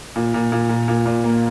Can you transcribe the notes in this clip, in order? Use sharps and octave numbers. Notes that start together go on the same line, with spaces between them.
A#2
A#2
A#2
A#2
A#2
A#2
A#3